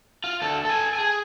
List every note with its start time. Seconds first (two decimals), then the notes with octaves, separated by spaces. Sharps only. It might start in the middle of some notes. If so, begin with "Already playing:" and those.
0.24 F4
0.42 D2 A4
0.65 A4 G#5
0.95 G#4 G#5